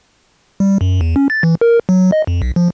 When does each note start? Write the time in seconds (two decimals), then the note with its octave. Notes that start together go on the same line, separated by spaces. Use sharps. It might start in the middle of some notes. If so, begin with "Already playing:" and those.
0.60 G3
0.81 F#2
1.01 E2
1.16 C#4
1.30 A6
1.43 E3
1.61 A#4
1.89 F#3
2.12 D#5
2.27 F2
2.42 B1
2.56 F3